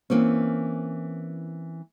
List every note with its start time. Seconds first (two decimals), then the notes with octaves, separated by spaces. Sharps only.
0.10 E3 A#3 C4 C#4